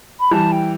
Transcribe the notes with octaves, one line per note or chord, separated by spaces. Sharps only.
B5
E3 G3 A5
G5